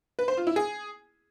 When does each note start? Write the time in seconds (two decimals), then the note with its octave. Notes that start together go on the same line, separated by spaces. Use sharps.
0.19 B4
0.28 C5
0.37 F4
0.47 E4
0.56 G#4